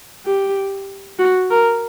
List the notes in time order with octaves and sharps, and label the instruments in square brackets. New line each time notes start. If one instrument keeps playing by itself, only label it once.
[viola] G4
F#4
A#4